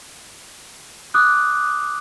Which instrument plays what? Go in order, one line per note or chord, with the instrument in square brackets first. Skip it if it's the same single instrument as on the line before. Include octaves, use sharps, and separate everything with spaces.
[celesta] D6 D#6 F#6